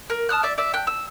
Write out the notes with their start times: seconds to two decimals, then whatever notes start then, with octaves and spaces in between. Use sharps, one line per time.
0.10 A#4
0.29 A5 D#6 F6 F#6
0.43 D5 E5
0.58 D5 E5
0.74 G5 F#6
0.87 E6